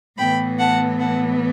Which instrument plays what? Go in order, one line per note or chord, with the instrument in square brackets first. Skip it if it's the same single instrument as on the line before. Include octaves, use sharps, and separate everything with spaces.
[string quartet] A2 E3 B3 G5 B5
F#5 A5
F#5 A5